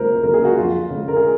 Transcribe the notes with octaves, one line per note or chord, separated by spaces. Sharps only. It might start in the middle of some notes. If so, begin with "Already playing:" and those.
Already playing: C#2 C#3 F#3 A#3 A#4 C5
C#3 F#3 A#3 A#4
G#4
F#4
F2 F4
C#3 G#3
A#4
G#4